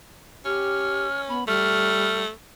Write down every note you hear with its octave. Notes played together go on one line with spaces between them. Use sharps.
C#4 G4 F6
B3 B5
G3 A3 F6